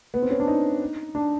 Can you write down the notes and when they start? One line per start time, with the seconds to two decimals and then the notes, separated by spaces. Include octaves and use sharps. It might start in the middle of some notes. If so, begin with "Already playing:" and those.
0.14 B3
0.22 C4
0.31 C#4
0.40 D4
0.48 D#4
1.15 D4